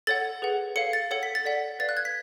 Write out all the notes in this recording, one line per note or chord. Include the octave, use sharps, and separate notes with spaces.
A4 C#5 F#5 A6
G#4 B4 F#5
A4 C#5 F5 C#7
A6
A4 C#5 F#5 C#7
B6
A6
A4 D5 F#5 B6
B4 D5 F5 A6
F#6
G#6
B6